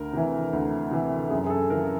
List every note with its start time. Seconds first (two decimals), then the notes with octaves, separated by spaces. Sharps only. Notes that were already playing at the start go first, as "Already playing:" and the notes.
Already playing: D2 A#4
0.13 C3 E3
0.53 D2
0.91 C3 E3
1.30 F#2 G#4
1.46 G#4
1.50 A4
1.70 C#3 E3 A#4